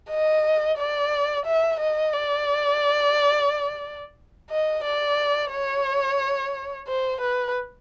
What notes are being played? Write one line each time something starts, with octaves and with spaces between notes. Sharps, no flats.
D#5
D5
E5
D#5
D5
D#5
D5
C#5
C5
B4